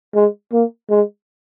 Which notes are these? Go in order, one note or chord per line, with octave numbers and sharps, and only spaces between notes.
G#3
A#3
G#3